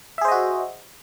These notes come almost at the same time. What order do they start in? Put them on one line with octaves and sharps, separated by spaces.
E5 G#4 C5 D#5 F#4